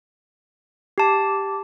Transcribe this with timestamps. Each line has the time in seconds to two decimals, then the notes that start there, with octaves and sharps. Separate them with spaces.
0.98 G4 A5